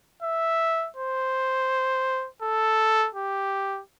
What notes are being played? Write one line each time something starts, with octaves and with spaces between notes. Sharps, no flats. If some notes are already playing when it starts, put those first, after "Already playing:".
E5
C5
A4
G4